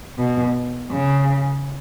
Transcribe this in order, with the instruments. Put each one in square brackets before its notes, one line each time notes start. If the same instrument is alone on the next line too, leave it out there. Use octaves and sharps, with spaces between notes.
[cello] B2
C#3